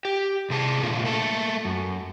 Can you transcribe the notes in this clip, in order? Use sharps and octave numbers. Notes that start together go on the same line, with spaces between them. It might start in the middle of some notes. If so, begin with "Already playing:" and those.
G4
C3 G#4 A5
A#2 D3 A3 F4
A3 A#3 A4
F#2